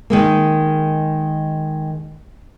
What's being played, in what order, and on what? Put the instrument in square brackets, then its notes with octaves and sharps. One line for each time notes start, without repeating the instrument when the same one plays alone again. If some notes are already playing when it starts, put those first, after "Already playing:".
[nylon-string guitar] D#3 G#3 A#3